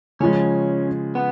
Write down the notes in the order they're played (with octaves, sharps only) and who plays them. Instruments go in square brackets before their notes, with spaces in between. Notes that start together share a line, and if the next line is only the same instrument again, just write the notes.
[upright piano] C#3 F3 G#3 [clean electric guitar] C#4
[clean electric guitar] B3